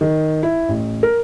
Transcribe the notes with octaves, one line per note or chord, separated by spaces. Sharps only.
D#3
E4
A1
A#4